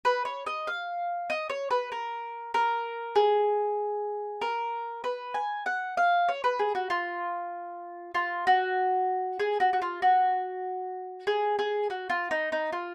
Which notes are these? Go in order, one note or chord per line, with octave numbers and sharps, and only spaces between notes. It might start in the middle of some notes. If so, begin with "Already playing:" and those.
B4
C#5
D#5
F5
D#5
C#5
B4
A#4
A#4
G#4
A#4
B4
G#5
F#5
F5
C#5
B4
G#4
F#4
F4
F4
F#4
G#4
F#4
F#4
F4
F#4
G#4
G#4
F#4
F4
D#4
D#4
F4